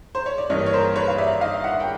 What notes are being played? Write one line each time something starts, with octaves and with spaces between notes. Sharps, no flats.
C5
C#5
D5
G2 E3 G3 A#3 C#5 D#5
C#5
A#4 C5
B4 C#5
F5
D5 E5
D#5 F5
E5 F#5
G5